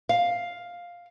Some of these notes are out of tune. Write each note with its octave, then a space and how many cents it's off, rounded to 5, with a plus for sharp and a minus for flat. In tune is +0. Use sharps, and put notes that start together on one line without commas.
F5 +5